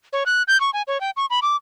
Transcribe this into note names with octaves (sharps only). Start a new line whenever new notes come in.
C#5
F#6
G6
C#6
G#5
C#5
G5
C#6
B5
D6